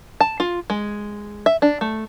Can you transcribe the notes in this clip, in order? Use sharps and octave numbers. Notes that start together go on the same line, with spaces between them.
A5
F4
G#3
E5
D4
A3